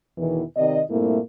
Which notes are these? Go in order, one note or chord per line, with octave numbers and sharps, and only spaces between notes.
E2 B2 D#3 E3
C3 D#3 D5 D#5
G2 A#2 A3 A#3 C4 E4